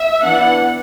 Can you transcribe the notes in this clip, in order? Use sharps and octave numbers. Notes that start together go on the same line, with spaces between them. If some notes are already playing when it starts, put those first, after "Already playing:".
Already playing: E5
E3 B3 D4 F#5